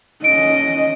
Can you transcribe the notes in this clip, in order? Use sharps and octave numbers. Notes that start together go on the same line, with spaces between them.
C#4 D#5 D7